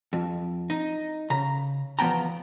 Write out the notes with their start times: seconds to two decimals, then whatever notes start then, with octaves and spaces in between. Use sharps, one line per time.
0.13 F2
0.70 D#4
1.30 C#3 A#5
1.99 E2 F3 B3 G5 A#5